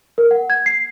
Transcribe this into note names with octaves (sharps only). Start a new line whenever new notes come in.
A#4
F#5
G#6
C7